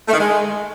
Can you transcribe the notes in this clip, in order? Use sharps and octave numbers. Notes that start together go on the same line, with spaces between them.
A3
D#3
G#3